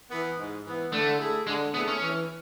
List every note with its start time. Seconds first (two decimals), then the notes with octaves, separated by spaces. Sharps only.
0.10 E3 B3
0.38 G#2
0.65 E3 B3
0.92 D3 A3
1.19 A3 E4 G#4
1.47 D3 G#3
1.74 A3 B3 E4 G#4
1.88 C#4
2.01 E3